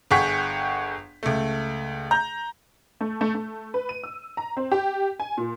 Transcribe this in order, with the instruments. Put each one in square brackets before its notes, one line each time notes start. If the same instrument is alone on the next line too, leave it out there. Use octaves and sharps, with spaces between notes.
[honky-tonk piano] G1 G#4 F#5 G5 C#6 B6
C#2 A3
A#5 G6
A3
A3
A3
B4
D#7
E6
A#5
C4
G4
G#5
A#2